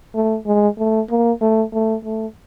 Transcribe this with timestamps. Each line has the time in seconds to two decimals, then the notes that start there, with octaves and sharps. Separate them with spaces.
0.15 A3
0.46 G#3
0.78 A3
1.10 A#3
1.41 A3
1.73 A3
2.04 A3